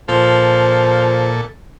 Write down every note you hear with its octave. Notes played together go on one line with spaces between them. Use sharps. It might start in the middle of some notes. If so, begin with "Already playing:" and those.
A#2 F3 A4